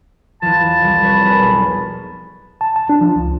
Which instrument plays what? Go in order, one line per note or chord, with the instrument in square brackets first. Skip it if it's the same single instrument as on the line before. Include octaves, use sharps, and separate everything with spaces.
[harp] E2 F3 [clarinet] A5
[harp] C2 G3
B4 C#5
G#4 A#4 B4
B1
[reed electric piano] A5
A5
D4
F3
C#2